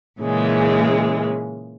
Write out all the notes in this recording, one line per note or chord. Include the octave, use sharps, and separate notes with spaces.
A#2 C#3 E3 G#3